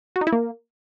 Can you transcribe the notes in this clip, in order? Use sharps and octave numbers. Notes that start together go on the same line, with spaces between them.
F#4
D#4
E4
A#3